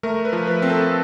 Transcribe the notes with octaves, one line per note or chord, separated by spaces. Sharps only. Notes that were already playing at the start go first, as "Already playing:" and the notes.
A3 A#4
B4
F3
B4
C4
A4